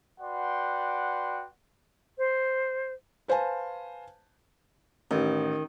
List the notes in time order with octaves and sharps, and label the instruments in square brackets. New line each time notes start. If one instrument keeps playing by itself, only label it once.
[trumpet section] F#4 B4 D5 F#5 G5 C6
[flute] C5
[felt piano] B4 C5 F5 G#5 A5
[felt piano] A1 [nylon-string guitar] D#3